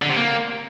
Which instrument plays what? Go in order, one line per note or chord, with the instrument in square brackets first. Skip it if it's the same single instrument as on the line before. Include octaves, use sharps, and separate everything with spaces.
[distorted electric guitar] D3
C3
A#3